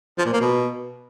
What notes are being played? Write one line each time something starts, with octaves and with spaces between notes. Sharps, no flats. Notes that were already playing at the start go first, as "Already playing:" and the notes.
F3
A#2
A#3
B2